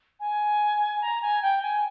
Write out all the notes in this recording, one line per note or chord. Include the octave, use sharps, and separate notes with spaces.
G#5
A#5
G#5
G5
G#5